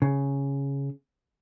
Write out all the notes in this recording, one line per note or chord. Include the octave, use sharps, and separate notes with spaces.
C#3